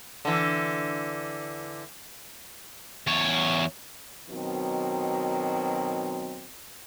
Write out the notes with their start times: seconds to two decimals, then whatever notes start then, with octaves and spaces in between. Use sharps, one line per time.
0.25 D3 E3
3.07 E2 C#5
4.30 B2 D#3 F#3 C4